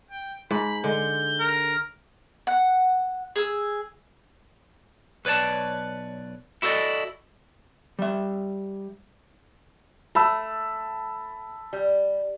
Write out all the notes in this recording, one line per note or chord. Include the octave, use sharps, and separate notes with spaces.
G5
G#2 B5
D3 G#3 G6
A#4
F#5
G#4 E6
B1 B4 C#5 D5 A5
E4 F#4 A4 C5 D5 D#5
G3 E5
A3 A5 B5 E6
G3